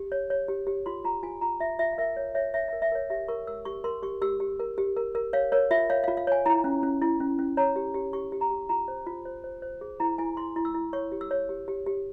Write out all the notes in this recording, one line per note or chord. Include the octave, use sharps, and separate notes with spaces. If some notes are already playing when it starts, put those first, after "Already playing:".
Already playing: G4
C#5
C#5
G4
G4
F4 C6
F4 A#5
F4 G#5
F4 A#5
F4 E5
F4 E5
F5
A#4 E5
C#5
C#5 E5
C#5 E5
E5
A#4
E5
A#4 C#5
G4 E5
A#4 C#6
A#4 E6
G4 C#6
A#4 C6
G4 C#6
G4 E6
G4
A#4
G4
A#4
A#4
C#5 F5
A#4 C#5
F4 E5
C#5 F5
F5
F4
F5
C#5 G#5
E4 A#5
C#4
C#4
E4
C#4
C#4
C#5 A#5
G4
G4
G4 C#6
G4
A#5
G4
F4 A#5
C5
F4
C5
C5
C5
G#4
E4 A#5
E4 G#5
E4 C6
E4
E6
E4
C#5 C#6
G4
E6
C#5
G4
G4
G4